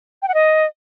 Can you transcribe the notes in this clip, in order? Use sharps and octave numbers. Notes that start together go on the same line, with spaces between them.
G5
F#5
D#5